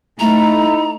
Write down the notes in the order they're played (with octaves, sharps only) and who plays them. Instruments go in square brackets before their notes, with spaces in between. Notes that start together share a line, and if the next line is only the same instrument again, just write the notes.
[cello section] A3 [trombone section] D#4 E4 [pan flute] A#5